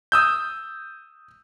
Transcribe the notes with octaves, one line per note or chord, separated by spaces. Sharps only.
D#6 E6 G6